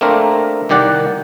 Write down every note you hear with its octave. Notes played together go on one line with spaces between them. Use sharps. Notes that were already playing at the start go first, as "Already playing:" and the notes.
A3 A#3 C4 D4 A#4
C2 D#3 G4 D5 F#5